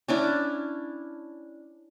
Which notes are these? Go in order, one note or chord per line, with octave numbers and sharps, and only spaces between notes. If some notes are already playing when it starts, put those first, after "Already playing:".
C#4 D4 E4